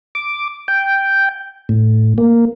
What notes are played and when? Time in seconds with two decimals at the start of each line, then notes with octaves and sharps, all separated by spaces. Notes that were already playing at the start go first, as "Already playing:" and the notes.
0.15 D6
0.68 G5
1.69 A2
2.18 A#3